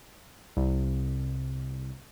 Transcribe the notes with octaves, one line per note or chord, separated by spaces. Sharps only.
C2